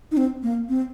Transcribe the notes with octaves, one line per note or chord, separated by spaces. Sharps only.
D#4
C4
A#3
C4